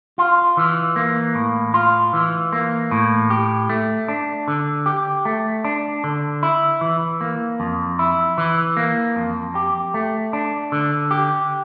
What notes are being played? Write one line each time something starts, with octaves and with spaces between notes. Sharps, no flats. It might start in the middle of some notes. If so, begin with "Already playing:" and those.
F4
E3
A#3
A2
F4
E3
A#3
A2
G4
A3
D4
D3
G4
A3
D4
D3
E4
E3
A#3
F2
E4
E3
A#3
F2
G4
A3
D4
D3
G4